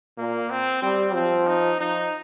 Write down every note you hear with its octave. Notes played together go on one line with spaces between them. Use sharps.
A#2 A#3
C4
G3 C4
F3 C4
D#4
F3 D#4